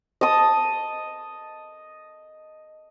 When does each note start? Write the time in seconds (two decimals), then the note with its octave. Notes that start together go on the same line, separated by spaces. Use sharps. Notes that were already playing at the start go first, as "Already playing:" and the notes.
0.21 D#5 A5 D#6